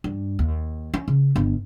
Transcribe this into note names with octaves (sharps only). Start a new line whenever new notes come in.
G2
D#2
C#4
C#3
G1